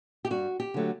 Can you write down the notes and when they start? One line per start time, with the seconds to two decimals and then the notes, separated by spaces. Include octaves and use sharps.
0.25 G4
0.30 G2 F#4
0.60 G4
0.74 D3 F#3 A3